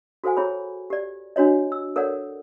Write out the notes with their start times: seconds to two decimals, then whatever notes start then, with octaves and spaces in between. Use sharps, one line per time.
0.24 F#4 A4 C5 F#5 G#5
0.37 E4 G#4 C#5 B5
0.90 G4 D5
1.36 D4 F#4 C#5 D#5
1.72 E6
1.96 A4 A#4 C#5 D5 F#5